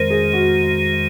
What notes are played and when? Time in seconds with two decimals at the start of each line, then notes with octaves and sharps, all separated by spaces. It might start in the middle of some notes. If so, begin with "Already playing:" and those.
Already playing: F2 D#3 G#3 A#4 C5
0.10 G#4
0.33 F#4